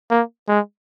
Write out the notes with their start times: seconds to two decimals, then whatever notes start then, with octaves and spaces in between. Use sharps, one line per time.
0.11 A#3
0.48 G#3